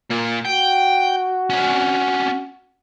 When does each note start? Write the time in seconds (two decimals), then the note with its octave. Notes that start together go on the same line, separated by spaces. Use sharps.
0.10 A#2 A#3
0.45 F#4 G5
1.50 C#4 D4